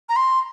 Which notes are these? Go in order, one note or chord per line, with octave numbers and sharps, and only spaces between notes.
A#5
C6